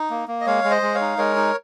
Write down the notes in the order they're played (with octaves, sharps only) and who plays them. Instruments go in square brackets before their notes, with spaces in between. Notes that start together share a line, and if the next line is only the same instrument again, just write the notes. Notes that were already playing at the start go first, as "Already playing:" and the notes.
Already playing: [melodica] D#4
A#3
A#3
D#5
G#3 C#5 F5
G#3
C5 D#5
G#3
C#5 F5
D#4
G#3 A#4 C#5
D#4